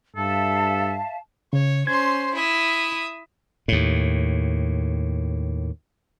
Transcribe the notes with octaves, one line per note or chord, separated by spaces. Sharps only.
G2 A4 E5 F5 A5
C#3 C#5
C#4 C5 C6 G#6
E4 E5 D#6
D#2 A2